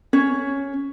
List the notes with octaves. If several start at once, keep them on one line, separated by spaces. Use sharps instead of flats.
C#4 C#5